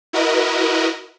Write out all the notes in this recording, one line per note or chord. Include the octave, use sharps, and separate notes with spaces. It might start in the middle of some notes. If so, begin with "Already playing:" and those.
E4 F#4 A#4 B4 D#5